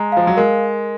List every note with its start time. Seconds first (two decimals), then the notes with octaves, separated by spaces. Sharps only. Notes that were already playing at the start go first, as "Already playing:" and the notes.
Already playing: G#3 A#5
0.12 F3 F5
0.27 F#3
0.37 G#3 A#4